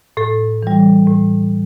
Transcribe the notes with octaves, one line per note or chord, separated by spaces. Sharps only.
A2 A4
E3 G3
A2